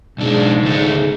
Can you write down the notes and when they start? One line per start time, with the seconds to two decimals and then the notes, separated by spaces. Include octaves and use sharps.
0.18 B1 G#2 D4
0.63 C#2 A3